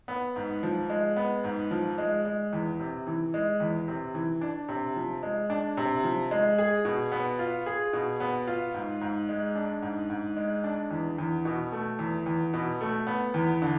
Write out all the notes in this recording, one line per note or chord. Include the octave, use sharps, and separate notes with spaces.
B3
G#2
F3
G#3
B3
G#2
F3
G#3
G#3
E2
C3
E3
G#3
E2
C3
E3
D4
C3
F3
G#3
D4
C3
F3
G#3
G#4
B2
B3
F4
G#4
B2
B3
F4
G#2
G#2
G#3
D4
G#2
G#2
G#3
D4
E2
E2
B2
A3
E2
E2
B2
A3
B3
E2
D3